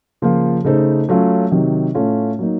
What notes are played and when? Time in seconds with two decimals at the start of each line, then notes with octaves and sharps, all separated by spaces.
0.22 C#3 F3 A#3 F4
0.64 C#3 A3 D#4 A4 C5
1.09 F#3 A3 C#4 F4
1.52 C3 D#3 F#3
1.95 A2 A3 C#4 F4
2.39 F#3 A#3 D#4